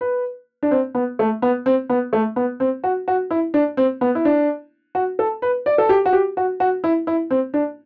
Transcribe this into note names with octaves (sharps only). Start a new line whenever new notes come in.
B4
D4
C4
B3
A3
B3
C4
B3
A3
B3
C4
F#4
F#4
E4
D4
C4
B3
E4
D4
F#4
A4
B4
D5
A4
G4
F#4
G4
F#4
F#4
E4
E4
C4
D4